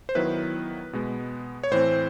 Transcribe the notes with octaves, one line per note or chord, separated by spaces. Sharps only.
C5
D#3 F#3 B3 E4 B4
B2 G#3 B3
C#5
A2 E3 A3 C4 C5